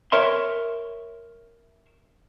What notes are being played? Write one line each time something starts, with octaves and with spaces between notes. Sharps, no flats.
A#4 C#5 E5 C6